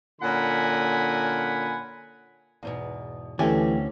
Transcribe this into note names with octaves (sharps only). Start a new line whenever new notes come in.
A#2 D3 C#4 F#5 G#5 B5
E2 G#2 B2
D2 E3 A3 C4 C#4 G4 G#5